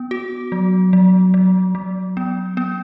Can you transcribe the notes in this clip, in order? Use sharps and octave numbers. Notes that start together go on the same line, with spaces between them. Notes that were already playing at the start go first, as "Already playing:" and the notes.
Already playing: B3
F#4
F#3
F#3
F#3
F#3
B3
B3